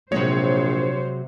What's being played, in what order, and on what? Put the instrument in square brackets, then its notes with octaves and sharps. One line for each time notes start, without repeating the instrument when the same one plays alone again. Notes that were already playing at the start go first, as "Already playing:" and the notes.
[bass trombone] A#1 [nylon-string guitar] C3 F#3 G#3 [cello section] C5 [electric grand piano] C#5